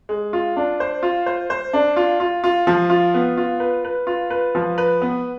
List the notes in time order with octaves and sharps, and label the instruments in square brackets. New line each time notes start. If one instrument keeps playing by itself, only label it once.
[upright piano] G#3
F4
D4
C5
F4
C5
C5
D4
F4
F4
F4
F3
F4
B3
F4
B4
B4
F4
B4
F3
B4
B3